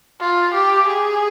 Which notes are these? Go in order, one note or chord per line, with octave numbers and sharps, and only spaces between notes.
F4
G4
G#4